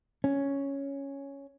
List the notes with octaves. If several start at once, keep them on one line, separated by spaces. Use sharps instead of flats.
C#4